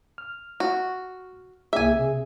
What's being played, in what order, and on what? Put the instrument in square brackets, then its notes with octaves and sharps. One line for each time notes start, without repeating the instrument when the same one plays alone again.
[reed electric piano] F6
[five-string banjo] F#4
[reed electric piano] C2 A#3 G#4 [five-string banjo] E5 G#5
[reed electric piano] C3 G#4